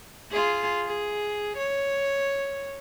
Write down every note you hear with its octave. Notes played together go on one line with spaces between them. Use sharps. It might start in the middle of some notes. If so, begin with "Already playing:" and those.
F4 G#4
G#4
C#5